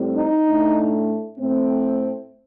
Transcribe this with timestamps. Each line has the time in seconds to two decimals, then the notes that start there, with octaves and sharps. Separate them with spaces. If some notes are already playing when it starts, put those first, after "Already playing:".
Already playing: A2 G3 C4
0.16 D#4
0.46 A2 A3 D4
1.38 A2 A3 C4